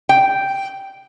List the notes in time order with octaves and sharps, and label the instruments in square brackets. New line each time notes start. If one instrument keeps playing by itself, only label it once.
[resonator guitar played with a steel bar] G5